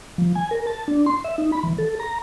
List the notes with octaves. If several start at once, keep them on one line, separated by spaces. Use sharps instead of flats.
F3
G#5
A#4
A5
D4
C6
E5
D#4
B5
E3
A4
A#5